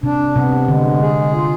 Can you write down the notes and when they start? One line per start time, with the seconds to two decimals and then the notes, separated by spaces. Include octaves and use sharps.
0.03 C3 D4
0.36 C3 B3
0.68 D3 G#3
1.00 D3 G#4
1.33 F4